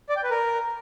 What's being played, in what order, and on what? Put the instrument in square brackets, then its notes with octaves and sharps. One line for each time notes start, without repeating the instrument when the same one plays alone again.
[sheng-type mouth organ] D5
G5
B4
A#4